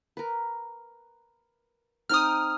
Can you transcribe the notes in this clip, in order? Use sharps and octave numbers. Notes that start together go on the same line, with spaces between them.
A#4 B4
C4 D#4 G5 D#6 F6